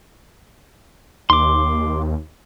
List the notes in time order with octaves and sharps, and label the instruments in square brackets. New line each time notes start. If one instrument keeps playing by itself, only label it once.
[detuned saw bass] D#2 [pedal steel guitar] C6 D6